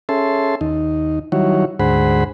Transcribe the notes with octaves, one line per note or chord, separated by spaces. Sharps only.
C#4 G#4 A4 E5 A5 C6
D#2 D#4
D#3 F#3 G3 E4 F#4 C#5
D2 G#2 G#4 C5 F#5 B5